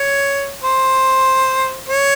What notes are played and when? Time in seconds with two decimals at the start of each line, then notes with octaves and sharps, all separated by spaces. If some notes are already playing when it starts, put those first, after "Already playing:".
Already playing: C#5
0.64 C5
1.89 C#5